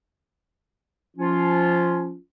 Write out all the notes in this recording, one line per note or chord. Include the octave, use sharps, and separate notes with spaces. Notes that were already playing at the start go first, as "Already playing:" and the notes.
F3 C#4 F4